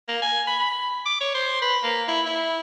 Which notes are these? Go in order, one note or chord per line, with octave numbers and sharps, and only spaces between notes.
A#3
G#5
B5
B5
D6
C#5
C5
B4
A#3
E4
E4